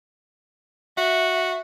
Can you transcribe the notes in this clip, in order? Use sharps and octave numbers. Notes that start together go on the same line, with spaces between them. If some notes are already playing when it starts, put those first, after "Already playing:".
F#4 E5